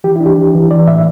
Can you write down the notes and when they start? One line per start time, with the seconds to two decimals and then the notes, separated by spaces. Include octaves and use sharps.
0.04 E3 G4
0.16 D4 E4
0.26 G4
0.38 E3
0.55 E3
0.71 E3 D5
0.87 A2 E5